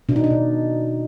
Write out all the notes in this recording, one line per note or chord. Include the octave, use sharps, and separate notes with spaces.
B2 D4
D#4
D4
B2